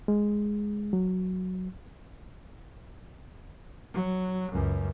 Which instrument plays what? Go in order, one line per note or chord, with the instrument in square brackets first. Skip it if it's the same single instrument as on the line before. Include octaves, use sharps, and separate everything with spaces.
[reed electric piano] G#3
F#3
[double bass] F#3
C#2 F#2